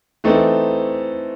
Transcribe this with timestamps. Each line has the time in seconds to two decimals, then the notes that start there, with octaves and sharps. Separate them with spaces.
0.24 E3 A3 C4 D#4